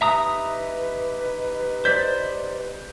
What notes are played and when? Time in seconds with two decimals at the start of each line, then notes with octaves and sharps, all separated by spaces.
0.01 D#4 G4 B4 E5 A#5 D#6
1.85 C5 D5 G6 B6